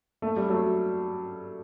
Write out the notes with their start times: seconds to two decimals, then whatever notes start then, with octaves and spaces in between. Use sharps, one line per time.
0.22 A3
0.36 G3
0.49 F#3 A3